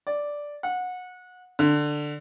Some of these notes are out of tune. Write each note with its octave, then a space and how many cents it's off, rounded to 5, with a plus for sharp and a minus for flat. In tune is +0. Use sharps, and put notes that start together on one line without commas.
D5 -5
F#5 -25
D3 +10